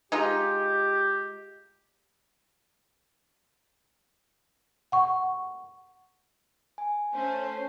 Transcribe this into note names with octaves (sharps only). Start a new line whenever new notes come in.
G#3 D#4 F4 G4
F#5 C#6
G#5
A3 C#4 C5